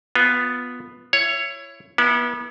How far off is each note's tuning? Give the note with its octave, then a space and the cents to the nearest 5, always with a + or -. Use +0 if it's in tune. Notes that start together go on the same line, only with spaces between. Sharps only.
B3 +0 F4 +10
E4 +25 C#5 +0
B3 -35 E4 +0